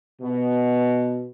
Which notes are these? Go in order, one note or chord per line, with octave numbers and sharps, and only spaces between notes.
B2